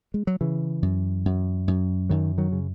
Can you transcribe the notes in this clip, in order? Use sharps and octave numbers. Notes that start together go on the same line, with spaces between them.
G#3
F#3
C#3 E3
F#2
F#2
F#2
F#2 D#3 F#3
D#3 F#3
C#3